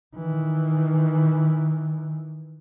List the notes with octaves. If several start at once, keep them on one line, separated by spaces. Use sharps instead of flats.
D#3 E3